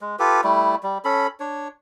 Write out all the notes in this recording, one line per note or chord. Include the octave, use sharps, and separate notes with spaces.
G#3
F4 G4 A4 B4
G3 A3 E4
G3
C#4 A4 B5
D4 C#5